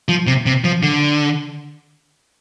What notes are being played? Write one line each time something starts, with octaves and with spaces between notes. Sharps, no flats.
F3
C3
C3
F3
D3